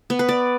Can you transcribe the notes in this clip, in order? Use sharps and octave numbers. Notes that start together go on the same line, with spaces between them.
B3
B4
D5